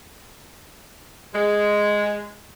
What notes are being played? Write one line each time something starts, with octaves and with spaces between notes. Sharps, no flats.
G#3